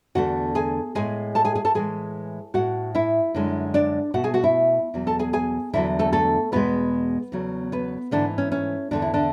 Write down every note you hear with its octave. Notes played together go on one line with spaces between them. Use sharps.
E2 D3 F#3 A3 F#4 F#5
G#4 G#5
A2 G#3 G#4 G#5
A4 A5
G#4 G#5
G#4 G#5
A4 A5
A2 E3 G#3 G#4 G#5
A2 G#3 F#4 F#5
E4 E5
F#2 D3 G#3
D4 D5
B2 A3 F#4 F#5
G#4 G#5
F#4 F#5
E4 E5
E2 B2 F#3
A4 A5
G#4 G#5
G#4 G#5
E2 D3 F#3 E4 E5
A3 A4
A3 A4
E2 B2 G#3 B3 B4
E2 C#3 F#3 A3
B3 B4
G#2 D3 E3 A3 D4
C#4
C#4
E2 D3 A3 D4
E4
D3 D4